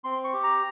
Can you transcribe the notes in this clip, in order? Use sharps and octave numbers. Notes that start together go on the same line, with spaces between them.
C4 C6
C#6
G4
A#5